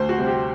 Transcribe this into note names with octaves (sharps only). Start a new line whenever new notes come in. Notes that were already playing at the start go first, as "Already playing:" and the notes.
Already playing: D2 C5
F#4
C3 G3 C4
G4